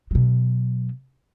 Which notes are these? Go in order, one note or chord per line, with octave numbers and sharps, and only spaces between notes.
B2 F#3